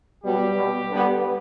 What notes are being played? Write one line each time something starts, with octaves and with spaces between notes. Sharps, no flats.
B2 F#3 G3 B3 G4
B2 G3 B3
D3 G3 B3